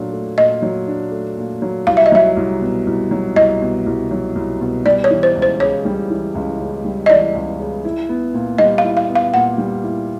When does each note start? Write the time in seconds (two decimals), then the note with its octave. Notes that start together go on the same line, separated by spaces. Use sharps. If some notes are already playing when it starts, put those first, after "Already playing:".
Already playing: A#2 F#3 A3 D4
0.13 A3
0.37 A#2 D#5
0.62 F#3
0.87 D4
1.12 A3
1.37 A#2
1.62 F#3
1.87 C2 F5
1.97 E5
2.06 D#5
2.12 F#3 E5
2.37 C2
2.62 B2
2.87 C2
3.11 F#3
3.36 C2 D#5
3.61 B2
3.86 C2
4.11 F#3
4.35 C2
4.61 B2
4.86 G3 D5
5.04 C#5
5.10 E3
5.23 C5
5.36 C#2
5.42 C5
5.60 C#3 C#5
5.85 G3
6.10 E3
6.35 C#2
6.60 C#3
6.85 G3
7.06 D#5
7.10 E3 D5
7.35 C#2
7.59 C#3
7.85 E4
8.09 B3
8.34 A#2
8.58 G3 D#5
8.78 F5
8.84 E4
8.97 F5
9.09 B3
9.15 F5
9.34 A#2 F#5
9.58 G3
9.83 E4